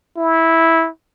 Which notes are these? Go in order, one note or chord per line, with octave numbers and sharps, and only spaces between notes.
E4